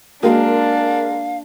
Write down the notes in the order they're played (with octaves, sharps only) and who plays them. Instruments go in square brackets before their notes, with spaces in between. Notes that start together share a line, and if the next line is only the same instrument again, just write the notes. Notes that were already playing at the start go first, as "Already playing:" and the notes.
[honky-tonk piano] G#3 A#4 [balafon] A#3 F#4 [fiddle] D4 [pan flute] F5